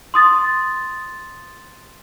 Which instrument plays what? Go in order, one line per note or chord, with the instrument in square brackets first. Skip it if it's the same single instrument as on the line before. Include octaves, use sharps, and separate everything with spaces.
[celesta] C6 D#6 A6